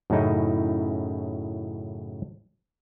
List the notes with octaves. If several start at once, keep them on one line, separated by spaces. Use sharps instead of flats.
F#2 A2 C#3 D#4 E4